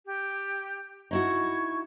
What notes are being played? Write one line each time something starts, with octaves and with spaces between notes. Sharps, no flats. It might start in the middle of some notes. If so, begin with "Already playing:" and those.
G4
D#4 E4 F#4 C#6 G#6